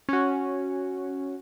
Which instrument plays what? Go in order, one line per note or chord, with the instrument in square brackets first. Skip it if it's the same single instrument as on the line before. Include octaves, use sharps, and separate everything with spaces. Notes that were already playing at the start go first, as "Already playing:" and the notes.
[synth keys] C#4 F#4